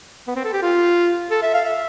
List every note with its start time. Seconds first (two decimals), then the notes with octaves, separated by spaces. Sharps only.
0.27 B3
0.35 C4
0.44 A4
0.53 G4
0.62 F4
1.31 A4
1.42 E5
1.54 F5
1.65 E5